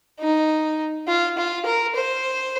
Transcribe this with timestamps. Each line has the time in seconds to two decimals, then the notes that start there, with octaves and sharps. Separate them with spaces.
0.20 D#4
1.08 F4
1.38 F4
1.66 A#4
1.96 C5